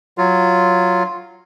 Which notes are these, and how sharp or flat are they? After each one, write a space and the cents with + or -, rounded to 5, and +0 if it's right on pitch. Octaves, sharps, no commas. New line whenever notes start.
F#3 +0 F4 +0